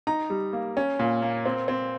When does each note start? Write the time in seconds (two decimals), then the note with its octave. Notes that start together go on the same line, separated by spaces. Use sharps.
0.07 D#4 A#5
0.30 G3
0.53 A#3
0.77 C#4
0.99 A#2
1.22 A#3
1.46 C4
1.68 C4